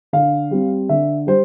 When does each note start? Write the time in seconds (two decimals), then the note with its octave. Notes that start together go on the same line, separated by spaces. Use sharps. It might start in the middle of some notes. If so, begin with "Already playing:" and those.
0.13 D3 F5
0.51 G3 C4
0.89 D3 E5
1.27 G3 C5